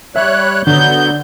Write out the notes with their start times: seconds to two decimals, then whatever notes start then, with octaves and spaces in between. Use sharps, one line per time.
0.16 G3 C#5 E5 F#6
0.67 D3 F#3 B3 G6